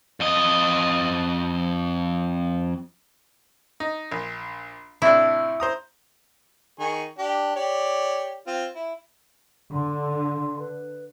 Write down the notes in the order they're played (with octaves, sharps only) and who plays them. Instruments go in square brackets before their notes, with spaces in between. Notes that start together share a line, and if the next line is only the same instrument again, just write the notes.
[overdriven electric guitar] F2 D#5
[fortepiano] D#4
A#1
[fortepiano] A2 C3 D4 [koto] E4
[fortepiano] C5 A#5 D#6
[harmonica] D#3 G#4 C#6
D4 G4
G4 C#5 D5
C4 F4
E4
[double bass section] D3 [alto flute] C6
[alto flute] B4